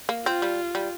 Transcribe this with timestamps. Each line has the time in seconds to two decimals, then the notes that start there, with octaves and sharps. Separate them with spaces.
0.09 A#3
0.26 C4 F4
0.42 G3
0.75 G3